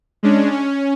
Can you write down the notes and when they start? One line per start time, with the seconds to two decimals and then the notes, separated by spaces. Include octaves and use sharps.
0.23 G#3 C#4 D4
0.51 C#4